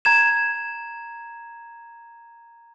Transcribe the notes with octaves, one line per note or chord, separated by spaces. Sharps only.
A#5 G#6 E7